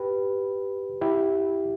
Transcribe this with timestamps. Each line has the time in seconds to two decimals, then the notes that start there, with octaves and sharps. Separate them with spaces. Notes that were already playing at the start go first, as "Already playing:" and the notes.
Already playing: G4 B4
1.01 E4 G4